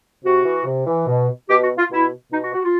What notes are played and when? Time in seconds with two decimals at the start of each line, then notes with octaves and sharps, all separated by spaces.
0.24 C3 F#4
0.45 E3
0.66 C3
0.87 E3
1.07 B2
1.49 B2 G4
1.64 F#4
1.78 F4
1.91 B2 E4
2.32 B2 D#4
2.43 F#4
2.53 F#4
2.64 F4